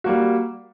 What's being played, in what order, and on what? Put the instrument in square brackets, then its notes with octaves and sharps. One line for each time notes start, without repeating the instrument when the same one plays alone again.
[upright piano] G3 A#3 F#4